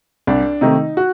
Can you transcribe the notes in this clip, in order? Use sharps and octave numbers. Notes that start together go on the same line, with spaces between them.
C2 D4
C3 D#3 A3 D#4
F#4